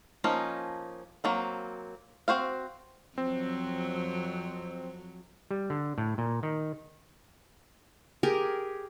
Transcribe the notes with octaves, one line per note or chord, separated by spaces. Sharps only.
F3 A#3 C#4 D#4
F#3 A#3 C4
C4 F#4 C5 F5
F2 F#3 C4
G3
D3
A2
A#2
D#3
G4 G#4 A#4